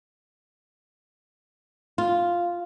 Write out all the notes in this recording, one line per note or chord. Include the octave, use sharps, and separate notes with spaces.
F4